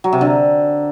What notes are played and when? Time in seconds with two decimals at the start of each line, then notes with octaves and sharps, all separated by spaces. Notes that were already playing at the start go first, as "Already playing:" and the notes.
0.04 F#3
0.13 C3
0.21 D3